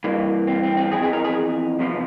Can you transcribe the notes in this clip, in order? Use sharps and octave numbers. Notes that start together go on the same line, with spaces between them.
G2 E3 A#3
C4
C4
C4
F2 E3 G#4
G#4
A#4
G#4
E2 C3 F3